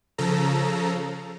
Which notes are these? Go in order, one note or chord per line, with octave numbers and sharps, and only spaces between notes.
C#3 F3 A4 A#5